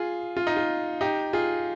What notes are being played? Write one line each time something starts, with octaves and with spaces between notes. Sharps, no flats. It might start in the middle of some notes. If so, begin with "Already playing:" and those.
Already playing: F4 G#4
F4
D#4
F4
D#4 G4
F4 G#4